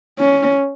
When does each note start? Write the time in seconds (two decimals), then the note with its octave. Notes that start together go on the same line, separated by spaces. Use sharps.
0.19 C#4